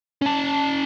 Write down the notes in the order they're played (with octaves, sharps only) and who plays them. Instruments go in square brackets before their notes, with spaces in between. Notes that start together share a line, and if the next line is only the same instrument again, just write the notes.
[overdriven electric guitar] C#4 A5